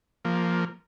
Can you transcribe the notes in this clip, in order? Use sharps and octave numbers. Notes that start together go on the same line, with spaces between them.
F3 A#3